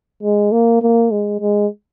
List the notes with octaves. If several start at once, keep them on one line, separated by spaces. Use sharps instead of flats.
G#3
A#3
A#3
G#3
G#3